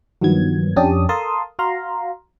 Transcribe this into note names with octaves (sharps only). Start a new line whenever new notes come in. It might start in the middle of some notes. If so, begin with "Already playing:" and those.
G2 D#3 F3 F#3 B3 G#6
F2 C#4 D4 G4 A5 D#6
A4 A#4 F5 A5 C6 D#6
F#4 F5 A#5 C6